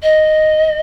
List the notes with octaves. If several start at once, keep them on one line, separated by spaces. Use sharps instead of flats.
D#5